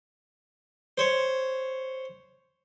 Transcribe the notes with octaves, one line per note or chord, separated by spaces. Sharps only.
C5 C#5